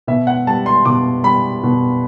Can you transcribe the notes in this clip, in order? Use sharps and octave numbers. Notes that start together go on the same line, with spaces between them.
B2 E5
F#5
G3 A5
C6
B2 D6
G3 B5
B2